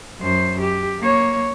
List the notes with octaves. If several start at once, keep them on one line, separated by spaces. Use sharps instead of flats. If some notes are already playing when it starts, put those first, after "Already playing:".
F#2 C5
G4
A#3 C#5